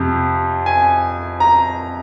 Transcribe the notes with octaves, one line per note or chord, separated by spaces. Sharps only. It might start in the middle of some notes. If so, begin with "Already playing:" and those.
Already playing: F2 C3
G#5
A#5